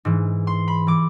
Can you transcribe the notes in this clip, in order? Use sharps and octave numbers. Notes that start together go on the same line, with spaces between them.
G#2 E3
C6
B5
E3 D6